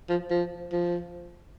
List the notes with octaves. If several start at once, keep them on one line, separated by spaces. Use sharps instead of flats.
F3
F3
F3